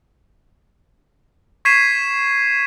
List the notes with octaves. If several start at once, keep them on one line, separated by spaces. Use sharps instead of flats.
C#6 G#6 B6 C7 D#7 E7